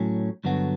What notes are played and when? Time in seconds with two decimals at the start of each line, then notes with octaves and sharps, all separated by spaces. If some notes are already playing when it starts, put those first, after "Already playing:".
Already playing: A2 F#3 C#4
0.44 G2 D3 F#3 B3 F#4